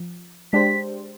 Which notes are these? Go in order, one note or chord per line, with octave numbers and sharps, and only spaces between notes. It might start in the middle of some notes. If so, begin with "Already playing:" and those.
Already playing: F3
G#3 D4 G4 C5 B6